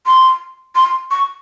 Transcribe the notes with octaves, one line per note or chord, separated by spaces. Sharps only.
C6
C6
C#6